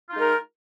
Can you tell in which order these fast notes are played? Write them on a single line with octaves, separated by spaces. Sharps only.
F4 D#4 G#3 A#4